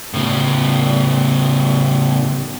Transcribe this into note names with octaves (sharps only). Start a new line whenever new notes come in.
A2 C#3